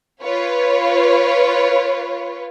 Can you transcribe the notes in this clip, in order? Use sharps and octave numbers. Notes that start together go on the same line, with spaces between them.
F4 B4 C#5